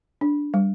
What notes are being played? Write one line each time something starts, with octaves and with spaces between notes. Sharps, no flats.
D4
G3